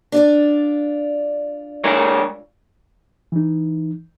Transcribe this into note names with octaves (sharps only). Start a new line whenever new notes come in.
D4 F4 D5
G#3 A#4 C#5
E3 D#4